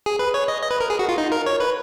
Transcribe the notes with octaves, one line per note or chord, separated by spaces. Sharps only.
G#4
B4
C#5
D#5
D#5
B4
A#4
G#4
F#4
F4
D#4
A#4
C#5
B4